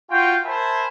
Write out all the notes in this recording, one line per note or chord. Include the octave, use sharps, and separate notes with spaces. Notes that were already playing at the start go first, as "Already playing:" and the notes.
F4 F#4 G5
A#4 C5 E5 G#5 A5 B5